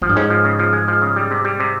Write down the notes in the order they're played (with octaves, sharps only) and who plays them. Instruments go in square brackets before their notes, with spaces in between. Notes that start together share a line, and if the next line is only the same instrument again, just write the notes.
[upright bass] G#2 [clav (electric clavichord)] F3
[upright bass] G2
[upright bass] G#2 [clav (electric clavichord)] C#4
[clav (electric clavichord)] F3
C#3
F3
G#3
F3
C#3
G3
C3
G3
C3